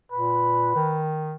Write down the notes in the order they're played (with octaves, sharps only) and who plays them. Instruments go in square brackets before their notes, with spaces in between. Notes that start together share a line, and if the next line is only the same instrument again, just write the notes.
[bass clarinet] A#2 [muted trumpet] B4
[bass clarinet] D#3